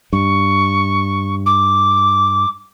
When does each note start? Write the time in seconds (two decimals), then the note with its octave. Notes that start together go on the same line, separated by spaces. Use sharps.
0.13 G2 C#6
1.46 D6